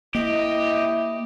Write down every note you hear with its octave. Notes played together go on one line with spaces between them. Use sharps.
A#3 E4 G4 D#5